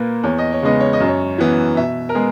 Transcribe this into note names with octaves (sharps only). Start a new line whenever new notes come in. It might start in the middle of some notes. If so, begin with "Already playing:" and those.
Already playing: A#2 A#3 A#4 B4
E2 C#5
D#5
C#5
C#3 G#3 B3 D#5
C#5
D#5
F#2
C#5
E3 B3
B2 E5
A#4
G#3 B3 G#4